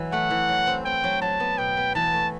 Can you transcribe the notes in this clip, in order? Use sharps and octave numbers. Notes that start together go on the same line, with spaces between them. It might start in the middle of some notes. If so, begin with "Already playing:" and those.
Already playing: E3 F#3 E4
A3 F#5
E3
F#3
C4
C4 G5
F#3
F#3 A5
B3
B2 G5
B3
E3 A5
A3